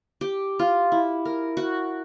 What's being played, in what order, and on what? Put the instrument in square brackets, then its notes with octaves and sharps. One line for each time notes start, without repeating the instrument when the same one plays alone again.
[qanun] G4
F4
E4
A#4
F#4